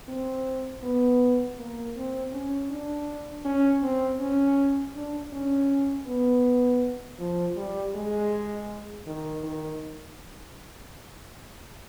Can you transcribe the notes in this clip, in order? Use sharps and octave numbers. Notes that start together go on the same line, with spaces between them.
C4
B3
A#3
C4
C#4
D4
C#4
C4
C#4
D4
C#4
B3
F3
G3
G#3
D#3
D#3